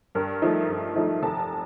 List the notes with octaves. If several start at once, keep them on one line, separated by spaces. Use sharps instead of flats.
G2 A#4
F3 A3 D#4
G2
F3 A3 D#4
F1 A5